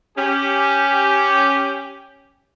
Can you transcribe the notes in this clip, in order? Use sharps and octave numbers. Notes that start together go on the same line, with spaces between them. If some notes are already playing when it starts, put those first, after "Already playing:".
C#4 G4